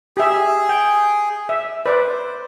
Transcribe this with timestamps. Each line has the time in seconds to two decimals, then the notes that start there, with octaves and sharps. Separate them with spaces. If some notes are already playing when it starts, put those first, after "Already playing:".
0.17 G4 G#4 E5
0.69 G5
1.49 E5
1.86 B4 C5 D5